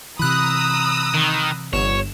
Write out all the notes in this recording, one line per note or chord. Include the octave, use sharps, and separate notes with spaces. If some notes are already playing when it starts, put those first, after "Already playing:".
C3 E3 A#5 B5 D#6 E6 F#6
D#3
G1 C#5 E7